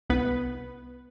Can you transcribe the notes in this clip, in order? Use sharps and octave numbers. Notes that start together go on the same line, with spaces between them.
C2 B3 B4